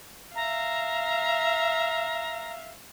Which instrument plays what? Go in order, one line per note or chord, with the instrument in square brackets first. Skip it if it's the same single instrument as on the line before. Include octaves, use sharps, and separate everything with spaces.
[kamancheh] E5 F5 [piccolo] A#5